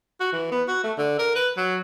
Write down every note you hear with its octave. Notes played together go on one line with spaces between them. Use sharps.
F#4
E3
B3
F#4
A3
D3
A#4
B4
F#3